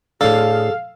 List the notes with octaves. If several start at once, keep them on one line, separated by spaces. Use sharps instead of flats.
A2 D4 G#4 A4 F5